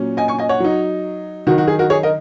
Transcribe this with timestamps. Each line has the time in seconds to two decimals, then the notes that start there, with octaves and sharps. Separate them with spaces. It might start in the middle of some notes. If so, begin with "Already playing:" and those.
Already playing: A#2 F#3 C#4
0.17 D#5 G#5
0.28 G#5 C#6
0.39 D#5 G#5
0.49 C#5 F#5
0.60 F#3 D#4
1.47 D#3 F#3 D#4 F#4
1.58 F#4
1.68 G#4
1.79 F#4 A#4
1.90 G#4 C#5
2.03 A#4 D#5